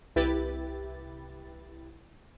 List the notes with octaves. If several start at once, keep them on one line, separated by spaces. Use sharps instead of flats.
C2 E4 G4 B4 A6